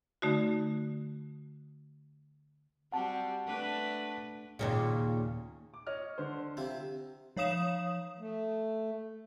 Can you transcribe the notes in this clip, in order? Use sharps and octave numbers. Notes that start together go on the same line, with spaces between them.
D3 A3 D#4 F#4
G3 C4 F#4 F#5 A5
A3 D4 B4
D#2 A#2 C#3
D6
C#5 D#5 F6
D3 C5
C3 E4 F4
F3 C#5 F5 D#6 E7
A3